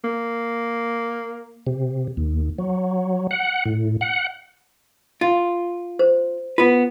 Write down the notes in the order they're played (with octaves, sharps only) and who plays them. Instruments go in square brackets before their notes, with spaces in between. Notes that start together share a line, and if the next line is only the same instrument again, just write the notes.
[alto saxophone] A#3
[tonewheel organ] C3
D#2
F#3
F#5
A2
F#5
[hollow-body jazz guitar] F4
[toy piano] C5
[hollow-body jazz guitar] B3 B4 [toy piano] F4